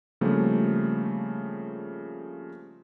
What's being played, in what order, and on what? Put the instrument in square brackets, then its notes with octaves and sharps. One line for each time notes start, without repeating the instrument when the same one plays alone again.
[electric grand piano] C#3 F3 G3 A3 A#3 C4